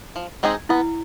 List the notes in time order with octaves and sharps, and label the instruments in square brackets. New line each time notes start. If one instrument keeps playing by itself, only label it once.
[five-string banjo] F3
G#3 C4 D#4 G#4
[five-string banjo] B3 [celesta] E4